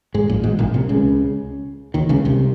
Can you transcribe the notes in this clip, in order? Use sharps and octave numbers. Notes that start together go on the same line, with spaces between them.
G#2 G#3
A#1 A#2
G#1 G#2
A#1 A#2
C2 C3
C#2 C#3
D#2 D#3
C#2 C#3
C2 C3